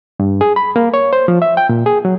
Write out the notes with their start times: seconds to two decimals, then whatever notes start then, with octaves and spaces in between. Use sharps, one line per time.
0.20 G2
0.41 G#4
0.56 B5
0.76 A#3
0.94 C#5
1.13 C5
1.28 F3
1.42 E5
1.57 G5
1.69 A#2
1.86 G#4
2.05 F#3